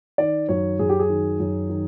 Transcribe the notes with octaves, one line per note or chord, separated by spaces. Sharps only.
D#3 D5
F#2 C#5
F#2 G#4
G4
G#4
D#3
F#2
D#3